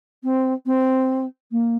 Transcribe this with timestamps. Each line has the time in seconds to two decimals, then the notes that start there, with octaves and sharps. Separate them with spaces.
0.23 C4
0.65 C4
1.51 A#3